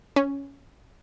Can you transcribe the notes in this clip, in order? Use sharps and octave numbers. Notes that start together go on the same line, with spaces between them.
C#4